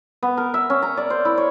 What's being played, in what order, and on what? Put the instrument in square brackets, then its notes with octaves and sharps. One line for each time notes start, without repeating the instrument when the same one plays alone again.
[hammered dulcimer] B3
A#4
E5
C#4
A#5
D5
C5
E4
C#5